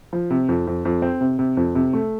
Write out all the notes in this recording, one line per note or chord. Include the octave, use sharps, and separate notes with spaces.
F3
C3
F2
F2
F2
C4
C3
C3
F2
C3
A3